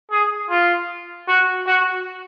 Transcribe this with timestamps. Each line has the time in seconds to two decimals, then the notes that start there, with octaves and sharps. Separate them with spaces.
0.11 G#4
0.50 F4
1.28 F#4
1.67 F#4